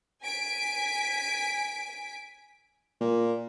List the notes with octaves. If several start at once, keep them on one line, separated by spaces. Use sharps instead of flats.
G#5 B6 D7
A#2